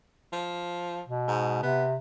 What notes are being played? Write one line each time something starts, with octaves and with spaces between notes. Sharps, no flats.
F3
B2
G#2
C3 B3